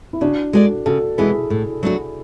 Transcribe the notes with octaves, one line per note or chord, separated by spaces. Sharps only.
E4
C#3 D4 F#4
G#3 D4 F#4 G#4 A4 D5
C#3 F#4 A4
E3 G#3 B3 E4 G#4
A2
F#3 A3 D4 F#4